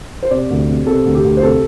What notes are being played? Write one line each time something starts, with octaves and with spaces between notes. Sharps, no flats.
C5
C3 D5
D2
C3
C3 A4
D2
G4
D2
C5
C3 A4